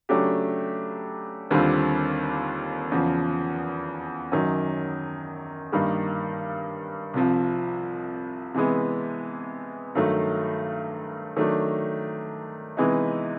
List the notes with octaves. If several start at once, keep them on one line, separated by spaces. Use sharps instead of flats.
C#3 F#3 A3 D4 G4
D#2 D3 G3 C4 F4
E2 C#3 F3
F#2 D#3 F#3
G2 D#3 G3 A#3
C2 C3 F3
C3 E3 G#3 B3
G2 D#3 F#3 A3
D#3 F#3 A3 D4
C3 E3 G#3 B3 D#4